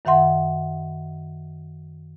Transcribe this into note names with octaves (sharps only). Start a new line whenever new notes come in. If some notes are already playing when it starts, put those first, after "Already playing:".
F#2 D#3 E5 F#5 C6